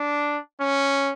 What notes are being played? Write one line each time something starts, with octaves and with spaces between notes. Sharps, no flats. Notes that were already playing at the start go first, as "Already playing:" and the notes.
Already playing: D4
C#4